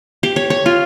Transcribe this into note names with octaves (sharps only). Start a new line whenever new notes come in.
G4
C#5
C#5
F4